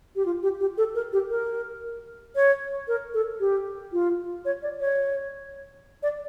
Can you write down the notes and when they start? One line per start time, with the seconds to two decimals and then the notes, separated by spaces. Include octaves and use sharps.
0.16 G4
0.26 F4
0.43 G4
0.60 G4
0.78 A4
0.95 A#4
1.13 G4
1.30 A#4
2.36 C#5
2.88 A#4
3.14 A4
3.40 G4
3.93 F4
4.45 C#5
4.63 D5
4.80 C#5
6.03 D5